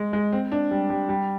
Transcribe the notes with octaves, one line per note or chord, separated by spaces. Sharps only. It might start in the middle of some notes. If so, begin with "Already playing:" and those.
Already playing: G#3
G#3
C4
D4
G3
G3
G3